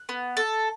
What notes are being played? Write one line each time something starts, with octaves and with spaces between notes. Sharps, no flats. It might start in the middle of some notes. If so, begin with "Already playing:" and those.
Already playing: F#6
B3
A4